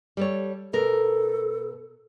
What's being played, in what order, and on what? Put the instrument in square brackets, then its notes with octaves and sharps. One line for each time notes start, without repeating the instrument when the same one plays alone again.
[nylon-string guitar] G3 A4 C#5
[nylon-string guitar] B2 A#4 [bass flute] A4